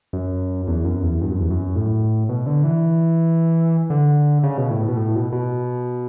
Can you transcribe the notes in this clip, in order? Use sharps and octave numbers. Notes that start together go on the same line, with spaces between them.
F#2
E2
F#2
E2
G2
F#2
E2
F#2
A2
B2
D3
E3
D3
C#3
B2
A2
B2
A2
B2
B2